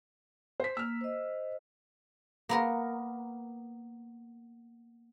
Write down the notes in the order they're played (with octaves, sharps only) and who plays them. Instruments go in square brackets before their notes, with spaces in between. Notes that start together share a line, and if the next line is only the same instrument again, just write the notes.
[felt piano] C5 B6
[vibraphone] A#3 [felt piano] E6 F6
[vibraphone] C5 D#5
[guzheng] A#3 B3 A#4